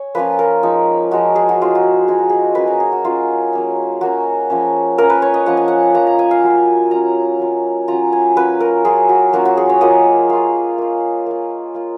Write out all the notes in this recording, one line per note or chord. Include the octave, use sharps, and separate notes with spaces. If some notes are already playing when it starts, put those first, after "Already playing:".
Already playing: C#5 G#5
F3 A#3 C#4 F4 B4
A#4
F3 G#3 D#4
F3 G#3 D#4 F#4
G#4
F#4
F3 G#3 D#4 F4
F#4
F3 G#3 D#4 G#4
F#4
G#4
F#3 A#3 C#4 B4
A#4
G#4
F#4
F#3 A#3 C#4 F4
F#3 A#3 C#4
F#3 A#3 C#4 F#4
F3 A#3 C#4
F3 A#3 C#4 A#4
B4
C#5
D#5
F3 A#3 C#4 F#5
G#5
F#5
F3 A#3 C#4 A#5
A#5
G#5
F5
F#3 C#4 F4
F#3 C#4 F4 A#5
F#3 C#4 F4
F#3 C#4 F4 A#5
G#5
F#3 A#3 C#4 F4 B4
A#4
F#3 A#3 C#4 F4 G#4
F#4
F#3 A#3 C#4 F4 F#4
F#4
G#4
C#5
F#3 A#3 C#4 F4 D#5
A#3 F4 F5
A#3 F4
A#3 F4
A#3 F4